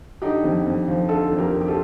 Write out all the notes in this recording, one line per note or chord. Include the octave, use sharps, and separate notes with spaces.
D3 D#4 G4
F2
F2
F3
D3 F4 A4
F2
G4 A#4
F2
G4
F4 A4